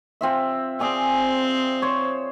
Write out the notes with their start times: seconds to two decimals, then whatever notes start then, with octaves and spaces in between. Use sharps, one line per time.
0.21 C4 F4 E5
0.80 C4 G#4 D5 G#5
1.82 C5 C#5